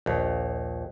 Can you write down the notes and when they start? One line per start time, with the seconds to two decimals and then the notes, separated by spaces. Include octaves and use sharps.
0.06 A#1 D#2